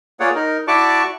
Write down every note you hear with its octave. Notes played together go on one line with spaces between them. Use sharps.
A#3 F4 G#4 C#5 D5 F#5
D#4 A#4
E4 F#4 D5 A5 C#6 D6